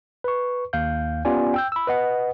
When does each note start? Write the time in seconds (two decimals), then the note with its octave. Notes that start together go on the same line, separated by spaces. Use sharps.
0.24 B4 C#6
0.73 D#2 F5 G6
1.25 B3 C#4 F4 G4 D5 G#5
1.54 G5 E6 G6
1.72 B5 E6
1.87 B4 D#5 F#5